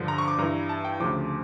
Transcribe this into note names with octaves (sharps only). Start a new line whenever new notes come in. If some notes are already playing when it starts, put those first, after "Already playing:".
Already playing: G2 D3 F3
A#5
C#6
D6
G2 E3 A#5
A5
G5
D2 C#3 F3 D6